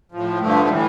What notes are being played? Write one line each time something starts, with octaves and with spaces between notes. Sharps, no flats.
A2 F3
G2 D3 F3 A3
A2 E3 G3